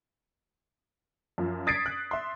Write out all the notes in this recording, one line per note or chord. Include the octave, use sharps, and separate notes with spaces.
F#2 F3
D#6 G#6 A6 B6 C7 D7
F#6
E5 C6